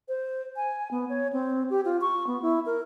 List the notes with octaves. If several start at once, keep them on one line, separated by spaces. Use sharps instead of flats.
C5
G#5
B3
C#5
C4
G4
F4
C#6
B3
E4
A#4